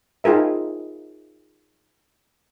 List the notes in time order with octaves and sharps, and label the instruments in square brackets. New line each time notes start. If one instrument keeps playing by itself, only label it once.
[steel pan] D#4 F4 G#4 A#4 E5